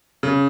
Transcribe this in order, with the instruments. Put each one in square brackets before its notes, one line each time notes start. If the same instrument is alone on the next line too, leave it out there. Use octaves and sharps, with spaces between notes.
[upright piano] C#3